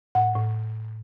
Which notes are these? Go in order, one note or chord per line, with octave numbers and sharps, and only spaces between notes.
A2 F#5
A2